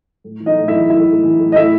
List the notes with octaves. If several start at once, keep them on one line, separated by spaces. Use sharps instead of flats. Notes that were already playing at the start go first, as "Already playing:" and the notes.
A2
E3
D#4 D#5
A2
E4 E5
E3
E3 E4 E5
A2
E3
A2
D#5
A2 E4 E5